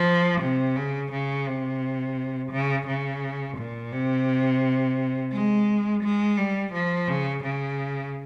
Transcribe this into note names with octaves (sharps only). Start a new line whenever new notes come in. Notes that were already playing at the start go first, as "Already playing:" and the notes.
Already playing: F3
C3
C#3
C#3
C3
C#3
C#3
A#2
C3
G#3
G#3
G3
F3
C#3
C#3